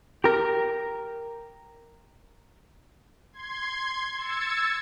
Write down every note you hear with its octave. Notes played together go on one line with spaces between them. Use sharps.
G4 A#4
C6 G#6
E6 G#6 A6 C#7